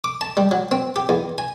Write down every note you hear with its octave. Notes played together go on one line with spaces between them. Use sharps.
D6
A5
G3
F#3
C4
G4
E2
G#5